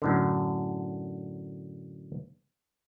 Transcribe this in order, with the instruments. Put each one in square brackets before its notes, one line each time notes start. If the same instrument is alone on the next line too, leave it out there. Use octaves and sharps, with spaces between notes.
[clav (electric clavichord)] F#2 A2 D3